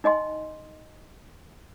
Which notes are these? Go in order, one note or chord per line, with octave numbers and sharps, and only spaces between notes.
D#4 D#5 G#5 C6